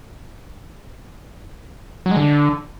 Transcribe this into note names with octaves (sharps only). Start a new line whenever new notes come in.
F#3
G#3
D3